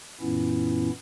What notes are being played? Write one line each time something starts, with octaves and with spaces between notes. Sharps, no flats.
F#2 A#2 E3 B3 C#4 E4